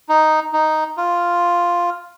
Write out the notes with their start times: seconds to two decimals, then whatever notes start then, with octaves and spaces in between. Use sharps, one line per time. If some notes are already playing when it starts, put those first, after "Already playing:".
0.09 D#4
0.53 D#4
0.97 F4